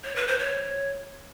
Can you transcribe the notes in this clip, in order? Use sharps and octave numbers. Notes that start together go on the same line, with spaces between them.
C#5
B4
C5
C#5